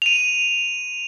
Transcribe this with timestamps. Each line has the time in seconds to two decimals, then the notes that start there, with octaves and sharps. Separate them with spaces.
0.02 D#7 F7